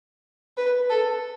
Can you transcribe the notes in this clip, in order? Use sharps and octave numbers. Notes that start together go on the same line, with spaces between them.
B4
A4